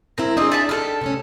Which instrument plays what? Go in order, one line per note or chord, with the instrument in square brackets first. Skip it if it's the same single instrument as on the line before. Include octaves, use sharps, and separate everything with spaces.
[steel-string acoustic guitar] G#3 C4 E4 [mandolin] A#4
[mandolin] C4 D#5 [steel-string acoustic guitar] D4 D#4 G#4
[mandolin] D5 E5 A5
[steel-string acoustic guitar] D4 G4 [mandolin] A4 F6
[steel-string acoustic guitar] C3 A3 C#4